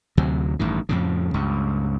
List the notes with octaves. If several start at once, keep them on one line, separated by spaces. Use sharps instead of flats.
D2 C3 F#3
A1 G2 D#3
F2 A2 C#3
C#2 G2